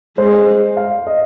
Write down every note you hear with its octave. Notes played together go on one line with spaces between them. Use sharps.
G#3 C5
F5
D#5